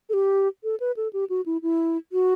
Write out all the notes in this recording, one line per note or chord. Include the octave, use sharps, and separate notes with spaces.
A4
G4
A4
B4
A4
G4
F#4
E4
E4
F#4